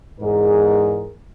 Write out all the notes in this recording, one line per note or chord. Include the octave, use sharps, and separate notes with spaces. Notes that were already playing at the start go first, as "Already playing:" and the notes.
E2 G#2 G#4 A#4